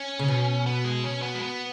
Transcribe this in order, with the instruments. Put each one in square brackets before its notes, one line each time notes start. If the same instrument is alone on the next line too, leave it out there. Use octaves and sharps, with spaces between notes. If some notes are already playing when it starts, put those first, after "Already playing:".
Already playing: [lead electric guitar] C#4
[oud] C#3
B2
[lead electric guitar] B3
G#3
C#4
B3
G#3
B3